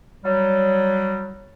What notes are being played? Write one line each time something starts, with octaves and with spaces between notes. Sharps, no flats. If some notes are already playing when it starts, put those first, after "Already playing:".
F#3 G3